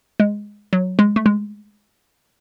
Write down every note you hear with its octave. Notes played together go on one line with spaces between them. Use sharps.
G#3
F#3
G#3
A3
G#3